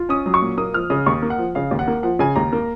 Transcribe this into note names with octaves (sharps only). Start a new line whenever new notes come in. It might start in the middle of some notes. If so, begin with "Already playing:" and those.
Already playing: F4
C#4 D#6
F#3
C#6
A#2
A#3 D#6
F3 F6
C#3 D#6
D#2 C#6
A#3
F#5
F3
C#3 F5
D#2
F#5
A#3
F3 F#5
C#3 G#5
D#2 A#5
A#3